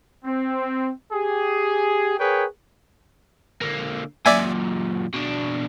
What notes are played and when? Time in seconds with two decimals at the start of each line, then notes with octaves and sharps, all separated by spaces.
0.25 C4
1.13 G4 G#4
2.19 G#4 A#4 B4 C#5 G5
3.62 D3 A#3
4.26 F#2 A#2 D5 E5 G#5
5.14 B2 D4